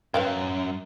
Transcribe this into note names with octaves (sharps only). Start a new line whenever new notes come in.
F#2 B4 F5 G5